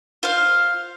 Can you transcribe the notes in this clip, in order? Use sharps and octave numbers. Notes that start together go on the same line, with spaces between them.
F4 C5 F5